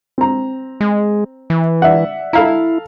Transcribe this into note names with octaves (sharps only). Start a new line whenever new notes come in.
C4 A#5
G#3
E3
D5 E5 F#5
E4 A4 F5 A#5